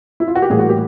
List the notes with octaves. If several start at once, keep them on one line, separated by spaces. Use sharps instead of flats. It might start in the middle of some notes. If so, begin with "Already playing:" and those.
E4
F4
F#4
G4
A2 E3 G3 A#3 G#4
F#4
G4